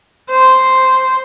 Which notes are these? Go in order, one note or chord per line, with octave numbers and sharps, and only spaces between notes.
C5